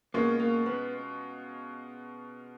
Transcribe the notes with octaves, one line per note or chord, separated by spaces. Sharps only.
B2 G#3 A#3 C#4 F4
A#3
B3